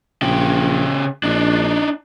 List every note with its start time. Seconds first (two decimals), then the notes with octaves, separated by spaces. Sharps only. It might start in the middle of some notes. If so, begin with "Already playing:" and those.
0.22 A#1 C#3 G4
1.23 A#1 D4 D#4